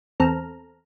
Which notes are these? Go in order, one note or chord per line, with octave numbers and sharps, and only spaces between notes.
E2 C4 A4 A#5 F6